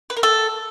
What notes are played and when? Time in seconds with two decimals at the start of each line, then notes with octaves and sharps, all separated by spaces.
0.10 B4
0.17 A#4
0.23 A4